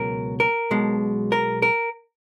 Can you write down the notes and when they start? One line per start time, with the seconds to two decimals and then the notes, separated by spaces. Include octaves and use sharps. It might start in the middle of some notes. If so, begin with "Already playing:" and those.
Already playing: C#2 B2 F#3 A#4
0.40 A#4
0.71 B1 B2 G#3
1.32 A#4
1.62 A#4